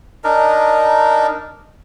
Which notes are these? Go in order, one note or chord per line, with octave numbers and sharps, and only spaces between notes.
D4 D#4 A#4